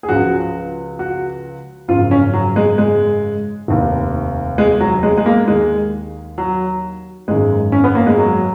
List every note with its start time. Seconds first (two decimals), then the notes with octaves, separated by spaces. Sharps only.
0.03 G#4
0.09 C#2 C#3 F3 F#4
0.99 F#4
1.88 G#1 F#2 C#3 F3 F4
2.11 C#4
2.33 F#3
2.56 G#3
2.78 G#3
3.68 F1 D#2 D#3
4.58 G#3
4.80 F#3
5.03 G#3
5.17 G#3
5.26 A#3
5.48 D#2 D#3 G#3
6.38 F#3
7.28 G#1 F#2 D#3 G#3
7.72 C#4
7.84 B3
7.95 A#3
8.06 G#3
8.18 F#3